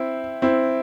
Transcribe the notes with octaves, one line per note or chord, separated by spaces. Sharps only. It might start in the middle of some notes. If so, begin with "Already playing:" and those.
Already playing: C4 E4
C4 E4